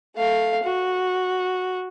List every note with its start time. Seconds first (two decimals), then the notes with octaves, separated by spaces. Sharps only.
0.16 A3 F5
0.63 F#4